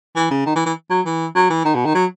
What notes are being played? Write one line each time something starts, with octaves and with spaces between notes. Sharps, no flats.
E3
C#3
D#3
E3
E3
F#3
E3
F#3
E3
D#3
B2
D#3
F#3